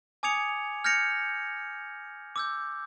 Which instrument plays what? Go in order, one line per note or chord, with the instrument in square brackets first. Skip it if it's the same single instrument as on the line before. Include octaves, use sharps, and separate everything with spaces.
[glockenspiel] G#5 D6 D#6 G#6 C#7 F7
F6 G6 G#6 A#6 C#7 F7
D6 E6 G6